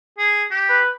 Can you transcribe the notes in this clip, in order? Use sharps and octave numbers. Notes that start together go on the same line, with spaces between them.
G#4
G4
B4